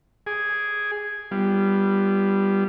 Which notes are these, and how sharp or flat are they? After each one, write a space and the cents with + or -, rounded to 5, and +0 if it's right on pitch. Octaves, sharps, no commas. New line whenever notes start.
G#4 +0 D6 -10
G3 +0 B3 -10 F4 -25